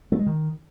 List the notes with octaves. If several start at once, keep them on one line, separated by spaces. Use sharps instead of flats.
A3
G#3
D#3